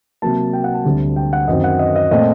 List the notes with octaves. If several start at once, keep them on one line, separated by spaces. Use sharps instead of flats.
C3 F#3 A#3 A5
G5
F#5
A5
D2 D3 G3 C4
G5
F#5
F#2 D#3 F#3 C4 D#5
F#5
D#5
D#5
A#2 A3 C4 D#5